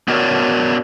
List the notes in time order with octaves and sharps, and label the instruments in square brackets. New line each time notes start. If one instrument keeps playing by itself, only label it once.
[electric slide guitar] B3 D4 F#4 A#4 C#5 D5